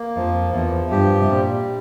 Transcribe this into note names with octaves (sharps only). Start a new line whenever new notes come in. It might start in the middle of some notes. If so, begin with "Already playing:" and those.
Already playing: A#3
F2 F3
E2 F3
G2 G4
C3
A#2 G3